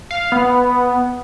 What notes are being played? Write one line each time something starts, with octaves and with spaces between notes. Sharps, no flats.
F5
B3